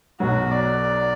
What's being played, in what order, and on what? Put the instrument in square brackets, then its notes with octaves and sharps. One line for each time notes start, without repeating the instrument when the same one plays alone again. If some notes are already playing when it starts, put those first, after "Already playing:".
[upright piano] B1 B2 F#3 [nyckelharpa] F#4
[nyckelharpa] D5